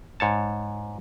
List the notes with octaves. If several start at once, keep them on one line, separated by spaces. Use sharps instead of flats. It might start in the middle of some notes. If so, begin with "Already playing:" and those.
G#2 C#5 A5